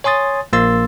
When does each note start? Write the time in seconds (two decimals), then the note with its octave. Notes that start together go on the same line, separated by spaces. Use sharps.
0.04 C#5 G#5 C6 D#6 A6
0.53 A#1 A#3 C6 E6 A6